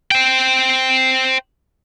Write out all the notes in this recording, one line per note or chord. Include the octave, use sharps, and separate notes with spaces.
C5 G5